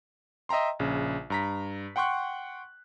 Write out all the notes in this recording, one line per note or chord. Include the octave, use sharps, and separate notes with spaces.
D#5 E5 G5 A#5 C6
A#1 C#3
G2 A#5 B6
F#5 G5 C6 C#6 F#6